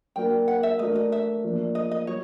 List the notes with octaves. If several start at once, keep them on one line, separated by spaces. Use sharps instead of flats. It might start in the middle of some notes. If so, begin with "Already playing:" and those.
F#3 A#3 D4 F#4 A#4 G5
F#5
E5
A3 D4 F#4 A#4 D#5
D#5
E5
F3 A#3 D4
D#5
D#5
F#3 C#5